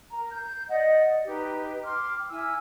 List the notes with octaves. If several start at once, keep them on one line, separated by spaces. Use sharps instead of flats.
A#4 A#5
G6
D5 D#5 F#5
D#4 G4 B4
G5 C6 D6 F6
E4 G#5 E6 F6